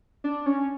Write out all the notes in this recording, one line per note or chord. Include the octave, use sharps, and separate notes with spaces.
D4
C#4